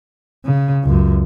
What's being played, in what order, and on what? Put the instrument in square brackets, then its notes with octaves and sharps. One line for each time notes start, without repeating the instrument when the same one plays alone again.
[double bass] C#3
C#2 F#2